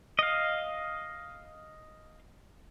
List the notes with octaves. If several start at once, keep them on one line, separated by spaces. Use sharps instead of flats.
D#5 F5